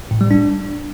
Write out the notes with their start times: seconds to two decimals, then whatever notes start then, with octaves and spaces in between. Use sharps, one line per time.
0.11 A2
0.21 G3
0.31 D4